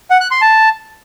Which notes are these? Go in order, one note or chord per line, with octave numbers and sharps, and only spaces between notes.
F#5
F#6
C6
A5